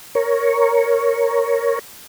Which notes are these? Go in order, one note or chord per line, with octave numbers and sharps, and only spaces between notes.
A#4 C#5